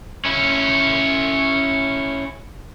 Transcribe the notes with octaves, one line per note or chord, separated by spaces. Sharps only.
C#4 E4